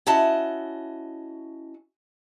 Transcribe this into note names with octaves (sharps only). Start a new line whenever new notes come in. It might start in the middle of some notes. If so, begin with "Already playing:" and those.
C#4 E4 F#4 D#5 A5